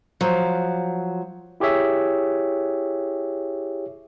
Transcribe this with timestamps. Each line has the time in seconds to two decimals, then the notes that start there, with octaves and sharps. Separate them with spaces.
0.21 F3 F#3
1.60 E4 G4 G#4 C#5 E5